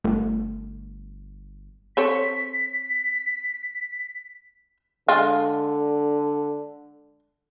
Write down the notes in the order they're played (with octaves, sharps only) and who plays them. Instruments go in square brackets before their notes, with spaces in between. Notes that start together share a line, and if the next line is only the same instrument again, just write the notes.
[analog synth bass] G1 [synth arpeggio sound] A3
[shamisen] C4 A4 C#5 [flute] B6
[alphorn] D3 [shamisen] G#3 F4